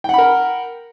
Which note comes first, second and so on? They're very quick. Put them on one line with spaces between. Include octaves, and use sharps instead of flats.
G5 F#5 B5 A#4